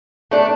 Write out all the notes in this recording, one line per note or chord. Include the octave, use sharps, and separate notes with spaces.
A3 D4